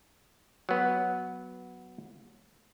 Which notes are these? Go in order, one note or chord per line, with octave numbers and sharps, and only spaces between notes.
F#3 B3